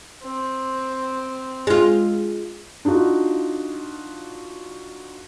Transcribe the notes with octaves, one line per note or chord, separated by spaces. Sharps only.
C4
G#3 F4
D4 D#4 F4 F#4